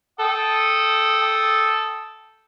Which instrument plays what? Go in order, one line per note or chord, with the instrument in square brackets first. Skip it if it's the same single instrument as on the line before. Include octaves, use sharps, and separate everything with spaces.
[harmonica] A4 G5 D#6